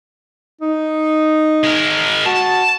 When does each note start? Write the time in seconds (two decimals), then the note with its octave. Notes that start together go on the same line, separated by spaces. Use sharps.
0.61 D#4
1.63 G#3 A#4
2.26 F#4 A5